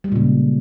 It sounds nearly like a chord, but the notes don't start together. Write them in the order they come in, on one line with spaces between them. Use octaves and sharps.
G3 G#3 A#2 C#3